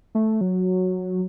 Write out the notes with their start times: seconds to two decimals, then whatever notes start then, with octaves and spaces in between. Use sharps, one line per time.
0.15 A3
0.41 F#3